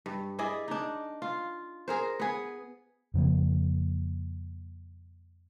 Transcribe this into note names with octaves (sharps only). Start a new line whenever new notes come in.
G2
E4 G#4 D5 D#5
D4 D#4
F4
G#4 A#4 C5
B3 G#4
F2 C#3 F3 A#3